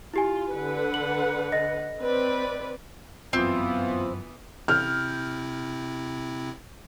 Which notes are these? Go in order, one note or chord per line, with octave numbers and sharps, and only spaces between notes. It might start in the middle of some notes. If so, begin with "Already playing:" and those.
E4 F4 G4 G#5
D3 B4 F#5
F#7
D#5 A#6
C4 B4 D5
G1 F#2 B2 E3 B3 C4 F4
C3 C4 E4 F6 G6